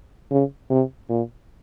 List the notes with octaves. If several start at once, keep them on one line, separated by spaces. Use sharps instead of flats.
C#3
C3
A#2